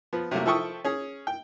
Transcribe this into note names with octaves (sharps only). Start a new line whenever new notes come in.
F3 B3
C3 F#3 A3 A#3
F3 E4 A4 G5 C#6 D#6
C#4 G#4
G5